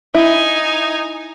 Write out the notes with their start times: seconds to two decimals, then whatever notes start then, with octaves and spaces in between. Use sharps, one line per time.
0.14 D#4 E4 G#5